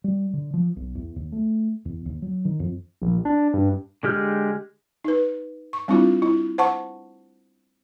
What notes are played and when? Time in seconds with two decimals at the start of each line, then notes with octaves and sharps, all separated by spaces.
0.04 G3
0.33 D3
0.54 F3
0.76 B1
0.95 E2
1.16 D#2
1.32 A3
1.85 E2
2.06 D#2
2.22 F#3
2.45 D#3
2.60 F2
3.02 A#1
3.25 D4
3.54 G2
4.03 D3 G#3 G4 F6 G6
5.04 D#4 B4
5.73 C#6
5.88 G3 C4 D4 E4 F4
6.22 E4
6.58 C5 F#5 A5 C#6